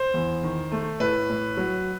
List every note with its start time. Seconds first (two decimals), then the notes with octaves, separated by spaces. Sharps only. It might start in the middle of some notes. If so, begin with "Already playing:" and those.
Already playing: C5
0.14 E2
0.43 D#3
0.72 A3
1.00 A2 B4
1.29 A2
1.57 F#3